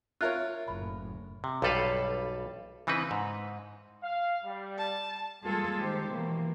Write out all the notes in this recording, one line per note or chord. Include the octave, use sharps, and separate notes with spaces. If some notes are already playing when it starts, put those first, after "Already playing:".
F4 A#4 C#5 E5 F#6
F#1 D2 A2 B5
C3
B1 G2 G3 A4 B4 F5
C#3 E3 C4 D#4 B4
G#2
F5
G3
A5
G3 G#3 A#3 F4 G#4 A4
D#3 G4 C5
B2 E3 A#3